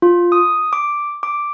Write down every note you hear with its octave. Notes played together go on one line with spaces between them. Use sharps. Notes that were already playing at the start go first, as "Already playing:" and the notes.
F4
D#6
D6
D6